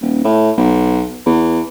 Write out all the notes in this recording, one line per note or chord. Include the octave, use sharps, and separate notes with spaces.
D#1
A2
B1
E2